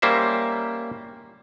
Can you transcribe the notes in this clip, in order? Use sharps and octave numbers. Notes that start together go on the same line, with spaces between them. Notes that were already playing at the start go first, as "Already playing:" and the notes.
G3 A#3 C#4 C5 E5